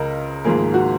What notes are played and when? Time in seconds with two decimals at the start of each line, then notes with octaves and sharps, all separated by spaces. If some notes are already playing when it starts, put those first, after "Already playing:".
Already playing: C#2 C#3 A#4 D#5
0.44 G#1 G#2 F3 A#3 G#4
0.74 F#4